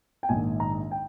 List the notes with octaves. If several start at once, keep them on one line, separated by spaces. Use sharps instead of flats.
G5
A#1 G#2 D#3 G#5
A#5
G5